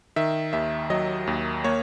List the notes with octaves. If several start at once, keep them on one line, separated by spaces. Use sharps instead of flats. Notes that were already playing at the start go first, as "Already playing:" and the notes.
D#3 E5
D#2 E5
F#3 D#5
D#2
A#3 C#5